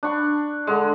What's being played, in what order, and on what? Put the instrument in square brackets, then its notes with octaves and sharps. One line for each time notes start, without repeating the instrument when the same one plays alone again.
[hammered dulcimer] D4 C#6
D3 G#3